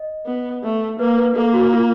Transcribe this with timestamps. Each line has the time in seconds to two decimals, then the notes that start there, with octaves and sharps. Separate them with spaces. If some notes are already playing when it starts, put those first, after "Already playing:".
Already playing: D#5
0.26 B3
0.63 A3
0.99 A#3 B4
1.18 B4
1.35 A#3 A4
1.54 F#4
1.73 F4